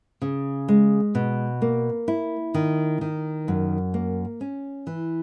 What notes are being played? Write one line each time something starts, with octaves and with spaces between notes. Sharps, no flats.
C#3
G#3
B2
A#3
E4
D#3
D#3
F#2
A#3
C#4
E3